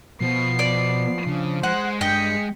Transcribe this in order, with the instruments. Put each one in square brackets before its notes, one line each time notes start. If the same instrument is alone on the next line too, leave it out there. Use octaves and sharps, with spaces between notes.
[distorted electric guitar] B2 [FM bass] F3 [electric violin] B3 C7
[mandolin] D5
[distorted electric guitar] C#3 [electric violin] D4
[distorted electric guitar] G#3 [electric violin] C5 [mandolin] F#5
[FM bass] G2 [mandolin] D#5 G5 [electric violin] B6 C#7